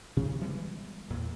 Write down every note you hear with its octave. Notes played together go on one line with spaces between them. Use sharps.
C3
E3 G3 G#3 B3
E2 A#2